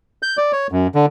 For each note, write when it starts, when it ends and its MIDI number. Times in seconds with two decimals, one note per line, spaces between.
0.23 0.37 91
0.37 0.52 74
0.53 0.67 73
0.72 0.87 42
0.95 1.06 50